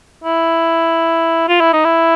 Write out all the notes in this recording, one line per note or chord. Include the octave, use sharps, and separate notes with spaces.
E4
F4
E4
D#4
E4